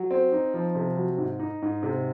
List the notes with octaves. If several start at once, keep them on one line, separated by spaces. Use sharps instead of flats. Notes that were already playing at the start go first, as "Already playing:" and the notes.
Already playing: F#3
C4
D#4
F3
C3
F#3
G#2
D#4
G#2
C3